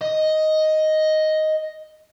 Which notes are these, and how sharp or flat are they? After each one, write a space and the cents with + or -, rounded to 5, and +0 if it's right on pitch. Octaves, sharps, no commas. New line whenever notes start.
D#5 +5